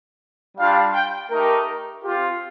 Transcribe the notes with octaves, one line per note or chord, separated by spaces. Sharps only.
G3 D4 F4 F5
G5
A3 D#4 G4 A#4
C4 F4 G4